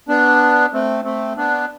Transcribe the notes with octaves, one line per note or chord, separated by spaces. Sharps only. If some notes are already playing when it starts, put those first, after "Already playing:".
B3 D4
A3 C4
A3 C4
B3 D4